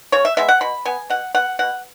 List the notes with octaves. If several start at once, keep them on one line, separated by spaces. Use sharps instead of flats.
C#3 C#5
E5
G#3 B3 E5
F#5
B2 B5
B3 G#5
B2 F#5
B3 F#5
B2 F#5